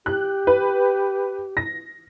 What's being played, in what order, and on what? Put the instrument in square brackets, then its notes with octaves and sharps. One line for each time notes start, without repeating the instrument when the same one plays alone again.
[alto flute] G4 [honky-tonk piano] F#6
[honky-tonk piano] B4
A#6